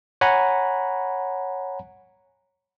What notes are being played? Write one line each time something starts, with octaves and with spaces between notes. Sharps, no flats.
C#5 F#5 G#5 A#5 B5